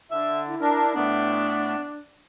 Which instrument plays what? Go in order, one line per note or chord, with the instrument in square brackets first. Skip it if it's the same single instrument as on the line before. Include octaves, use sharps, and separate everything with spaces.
[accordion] D3 [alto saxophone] E5
[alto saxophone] E4
[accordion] D4 A#4
[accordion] A2 A3 B3 [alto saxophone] D4